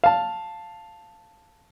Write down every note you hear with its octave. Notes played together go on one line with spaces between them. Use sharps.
F5 A5